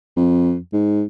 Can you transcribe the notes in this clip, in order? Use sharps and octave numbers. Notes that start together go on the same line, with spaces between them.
F2
G#2